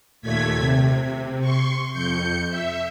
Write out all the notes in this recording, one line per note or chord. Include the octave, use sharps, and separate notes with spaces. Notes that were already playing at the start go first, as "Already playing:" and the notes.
D#2 A#2 A3 G#6 B6
C3
C6 C#6
F2 G6 C#7
E5